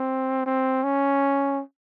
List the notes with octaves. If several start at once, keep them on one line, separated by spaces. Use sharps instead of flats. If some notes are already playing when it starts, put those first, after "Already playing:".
Already playing: C4
C4
C#4